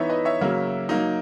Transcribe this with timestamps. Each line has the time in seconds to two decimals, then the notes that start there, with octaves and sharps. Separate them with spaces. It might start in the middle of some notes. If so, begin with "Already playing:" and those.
Already playing: E3 B3 D#4 C#5 E5
0.09 B4 D#5
0.25 C#5 E5
0.41 C#3 F#3 A#3
0.89 F#3 A#3 D#4